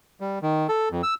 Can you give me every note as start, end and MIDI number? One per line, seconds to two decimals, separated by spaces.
0.20 0.39 55
0.42 0.67 51
0.69 0.89 69
0.91 1.02 41
1.03 1.14 88